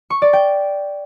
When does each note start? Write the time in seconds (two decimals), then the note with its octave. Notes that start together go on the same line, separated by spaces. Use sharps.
0.10 C#6
0.22 D5
0.33 G5